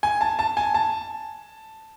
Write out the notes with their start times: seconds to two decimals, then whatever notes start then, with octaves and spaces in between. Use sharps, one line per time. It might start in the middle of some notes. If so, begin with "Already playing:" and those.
0.03 G#5
0.21 A5
0.39 A5
0.57 G#5
0.74 A5